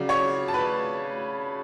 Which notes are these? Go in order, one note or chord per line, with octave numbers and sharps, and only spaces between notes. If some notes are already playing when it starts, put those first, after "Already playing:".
Already playing: C#3 F#3 D5
C#5 C#6
A5
B4 B5